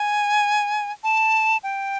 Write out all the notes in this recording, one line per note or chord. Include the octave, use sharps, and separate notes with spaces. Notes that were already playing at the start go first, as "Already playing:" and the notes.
Already playing: G#5
A5
G5